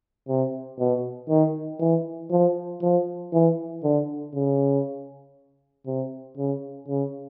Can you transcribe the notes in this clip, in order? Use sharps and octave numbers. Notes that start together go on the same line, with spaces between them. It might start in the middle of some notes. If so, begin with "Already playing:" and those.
C3
B2
D#3
E3
F3
F3
E3
D3
C#3
C3
C#3
C#3